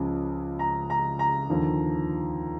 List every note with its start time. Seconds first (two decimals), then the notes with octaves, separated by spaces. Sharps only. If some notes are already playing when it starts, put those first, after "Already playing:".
Already playing: C#2 C#3 F3
0.59 A#5
0.90 A#5
1.19 A#5
1.50 D#2 D3 F3